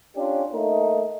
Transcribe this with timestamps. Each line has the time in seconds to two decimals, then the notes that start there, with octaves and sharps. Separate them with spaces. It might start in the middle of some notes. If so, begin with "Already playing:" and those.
0.16 C#4 D4 F4 G4
0.52 A3 A#3 D#4